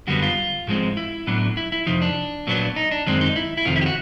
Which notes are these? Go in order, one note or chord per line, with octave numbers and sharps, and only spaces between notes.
F#2 D3 G3 B3 F#4
F4
G#2 F3 G#3 C4
E4
A2 F#3 B3 D4
E4
E4
F2 C3 F3 D#4
D4
A#2 F#3 B3 D4
D#4
D4
F#2 D#3 G#3 C4 D4
D#4
E4
E4
F2 C3 D#3 F4
E4
G4
F#4